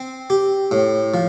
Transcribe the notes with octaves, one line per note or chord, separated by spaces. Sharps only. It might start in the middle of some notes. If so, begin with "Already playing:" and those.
Already playing: C4
G4
A2
F3